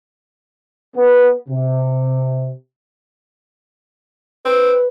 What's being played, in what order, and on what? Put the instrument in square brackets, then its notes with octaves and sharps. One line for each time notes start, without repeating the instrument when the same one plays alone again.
[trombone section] B3
C3
[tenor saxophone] C4 [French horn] B4